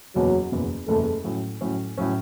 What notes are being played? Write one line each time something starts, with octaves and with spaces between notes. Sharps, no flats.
F#1 E2 B2 F#3
F#1 E2 B2
F#1 E2 B2 A3
A2 F#3 C#4
A2 F#3 C#4
A2 F#3 C#4